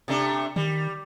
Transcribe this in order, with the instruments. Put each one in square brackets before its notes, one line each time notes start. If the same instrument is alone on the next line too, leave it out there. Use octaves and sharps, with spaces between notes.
[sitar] C3 A3 D4
[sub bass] D#3 [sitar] G3